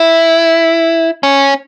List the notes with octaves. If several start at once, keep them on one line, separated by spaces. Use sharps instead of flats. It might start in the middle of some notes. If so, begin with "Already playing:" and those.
Already playing: E4
C#4